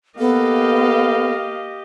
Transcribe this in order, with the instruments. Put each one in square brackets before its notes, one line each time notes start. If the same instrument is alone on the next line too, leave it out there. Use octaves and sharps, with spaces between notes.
[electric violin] A#3 F5 [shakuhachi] B3 [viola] G4 D#5 [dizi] A4